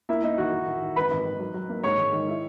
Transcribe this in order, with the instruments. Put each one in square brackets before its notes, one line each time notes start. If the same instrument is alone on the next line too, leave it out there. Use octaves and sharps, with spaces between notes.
[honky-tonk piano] A#3 [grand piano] E4 E5
[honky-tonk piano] A#3 [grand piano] D#4 D#5
[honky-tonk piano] D#3 [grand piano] F#4 F#5
[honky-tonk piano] D#3
D#3
D#3
[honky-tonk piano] G#1 [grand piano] B4 B5
[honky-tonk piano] G#1
D#3
F#3
F#3
A#3
[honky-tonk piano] G#2 [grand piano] C#5 C#6
[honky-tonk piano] D#3
D#3
E4